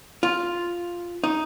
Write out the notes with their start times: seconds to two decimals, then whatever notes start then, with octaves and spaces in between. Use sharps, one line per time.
0.23 F4
1.24 D#4